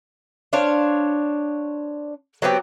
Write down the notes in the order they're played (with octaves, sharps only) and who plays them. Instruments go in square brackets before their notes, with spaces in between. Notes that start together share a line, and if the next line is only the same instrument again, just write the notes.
[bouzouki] D4 C5 C#5 F5
F#3 B3 C4 G4